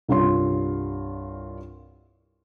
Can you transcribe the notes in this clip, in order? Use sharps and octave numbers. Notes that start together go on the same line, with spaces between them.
C2 G2 F4 C#5 C6